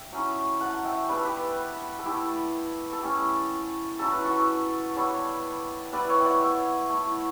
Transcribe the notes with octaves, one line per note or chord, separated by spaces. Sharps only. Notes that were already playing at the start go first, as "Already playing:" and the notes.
Already playing: E5 G5
F#3 C#4 E4
F#5 A5
E5 G5
G3 B3 D4 B4
A4
G4 B4
A4
A3 E4 G4
A4
A3 C#4 E4 G4
F#3 C#4 E4 A4
B4
F#4 A4
G3 B3 D4 A4 C#5
G3 B3 E4 B4 D5
C#5 E5
G5
D5 F#5
C#5 E5
A3 E4